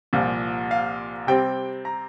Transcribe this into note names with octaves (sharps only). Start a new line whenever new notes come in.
C2 A#2 F3
F5
C3 G3 C4 G5
A#5